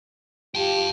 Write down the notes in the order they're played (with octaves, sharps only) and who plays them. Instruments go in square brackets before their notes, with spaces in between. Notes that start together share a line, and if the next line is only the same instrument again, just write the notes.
[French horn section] F4 G4 [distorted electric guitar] G5 A5